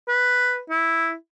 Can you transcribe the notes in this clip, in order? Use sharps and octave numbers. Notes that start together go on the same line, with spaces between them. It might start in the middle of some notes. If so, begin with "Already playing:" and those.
B4
E4